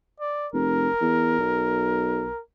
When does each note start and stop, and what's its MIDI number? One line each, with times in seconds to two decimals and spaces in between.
0.20 0.48 74
0.54 0.88 29
0.54 2.41 70
1.01 1.39 40
1.39 2.30 35